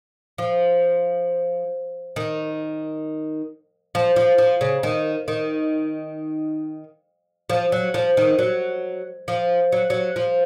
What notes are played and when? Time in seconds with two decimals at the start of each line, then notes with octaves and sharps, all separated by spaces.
0.38 F3
2.16 D#3
3.95 F3
4.16 F3
4.38 F3
4.61 C#3
4.83 D#3
5.28 D#3
7.50 F3
7.72 F#3
7.94 F3
8.17 D#3
8.39 F#3
9.28 F3
9.72 F#3
9.90 F#3
10.16 F3